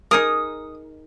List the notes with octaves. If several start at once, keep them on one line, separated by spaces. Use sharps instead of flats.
D#4 G#4 A#4 D#6